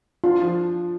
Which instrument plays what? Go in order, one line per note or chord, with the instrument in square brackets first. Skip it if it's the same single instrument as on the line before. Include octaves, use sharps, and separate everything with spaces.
[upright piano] D4 [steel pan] F4
[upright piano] F3